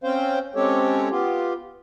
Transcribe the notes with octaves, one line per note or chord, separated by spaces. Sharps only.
C4 C#4 C5 F5 G5
G#3 C4 C#4 G4 A4 C#5
B3 F4 G4